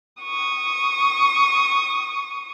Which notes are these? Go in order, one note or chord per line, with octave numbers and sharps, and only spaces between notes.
C#6 D#6